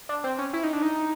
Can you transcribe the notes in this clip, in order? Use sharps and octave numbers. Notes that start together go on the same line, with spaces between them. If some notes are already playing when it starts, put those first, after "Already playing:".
D4
C4
C#4
E4
D#4
D4
D#4